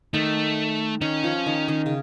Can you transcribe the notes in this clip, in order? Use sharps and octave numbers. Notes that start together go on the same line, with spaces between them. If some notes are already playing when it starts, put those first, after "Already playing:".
D#3 A3
D#3 C#4
F3
D#3
D#3
C#3